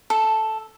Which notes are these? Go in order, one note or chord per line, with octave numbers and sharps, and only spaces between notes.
A4